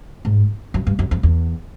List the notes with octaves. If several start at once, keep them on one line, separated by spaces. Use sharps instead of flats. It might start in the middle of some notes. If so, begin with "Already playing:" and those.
G#2
F#2
G2
F#2
F2
E2